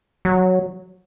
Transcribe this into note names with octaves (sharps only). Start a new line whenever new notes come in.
F#3